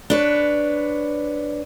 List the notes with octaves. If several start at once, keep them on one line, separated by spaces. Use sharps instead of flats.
D4 B4 C#5